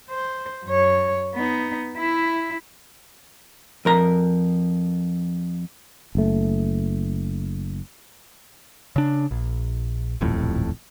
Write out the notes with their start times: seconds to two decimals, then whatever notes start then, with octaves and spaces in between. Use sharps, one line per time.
0.10 C5
0.65 F#2 C#5
1.35 B3 D#4
1.98 E4 E5
3.85 F2 A#4 A#5
6.15 F#1 A3
8.96 C#3 D4
9.31 A#1
10.21 D#1 B1 F2 A2